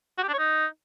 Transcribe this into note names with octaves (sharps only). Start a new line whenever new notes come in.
F#4
G4
D4
C#5
D#4